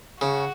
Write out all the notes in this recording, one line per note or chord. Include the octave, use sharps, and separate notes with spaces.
C#3 F#4